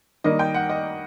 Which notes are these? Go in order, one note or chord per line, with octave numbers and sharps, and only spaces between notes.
D#3 G3 A#3 D#5
G5
F#5
D#5